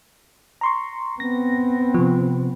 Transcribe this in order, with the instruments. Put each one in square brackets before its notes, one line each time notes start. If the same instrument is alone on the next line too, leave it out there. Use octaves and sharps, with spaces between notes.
[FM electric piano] A#5 C6 C#6
[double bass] B3 C4 [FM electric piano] A#6
[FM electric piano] C3 F3